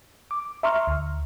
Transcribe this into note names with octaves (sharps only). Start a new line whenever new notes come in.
D6
E5 A#5 C6 C#6 F6
D2